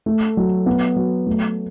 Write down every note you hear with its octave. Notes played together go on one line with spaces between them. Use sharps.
A3
F#3
B3
F#3
A3